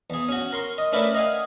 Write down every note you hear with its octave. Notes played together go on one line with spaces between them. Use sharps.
E2 G#4
C#4 F#4
A#4 C6 C#6
D#5
A3 C#4 E4 A#4 B4 D5
D#5 F5 F#5 G#5